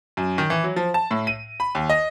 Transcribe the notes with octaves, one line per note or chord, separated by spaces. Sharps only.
F#2
D#3
E3
F#3
F3
A5
A2
D#7
B5
D#2
D#5